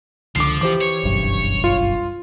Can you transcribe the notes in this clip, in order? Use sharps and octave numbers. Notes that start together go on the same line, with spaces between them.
C#2 D3 F3 D6 C7
E3 G4 C5 D6
C#5
F#1 B1 G2
F4